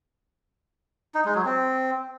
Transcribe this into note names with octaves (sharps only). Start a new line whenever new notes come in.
D#4
G#3
F#3
C4